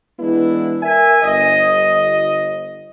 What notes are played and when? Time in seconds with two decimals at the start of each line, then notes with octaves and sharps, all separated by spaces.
0.20 E3 G#3 B3 D4 E4
0.83 A#4 E5 G#5
1.22 G1 D#5